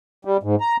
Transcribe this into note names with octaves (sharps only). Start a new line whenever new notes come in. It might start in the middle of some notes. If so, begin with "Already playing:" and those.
G3
G#2
A#5